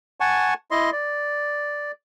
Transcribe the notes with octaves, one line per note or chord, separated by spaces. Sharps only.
F#5 G#5 A5 C#6
E4 D#5 C6
D5